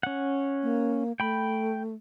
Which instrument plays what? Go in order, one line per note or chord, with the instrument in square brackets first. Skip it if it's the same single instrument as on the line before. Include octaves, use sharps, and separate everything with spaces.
[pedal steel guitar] C#4 F#5
[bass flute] A#3
[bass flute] A3 [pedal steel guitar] G5 B5